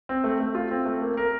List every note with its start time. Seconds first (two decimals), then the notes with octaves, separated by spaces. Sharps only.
0.09 C4
0.24 A3
0.40 A3
0.55 F4
0.71 C4
0.85 A3
1.02 A#3
1.17 A#4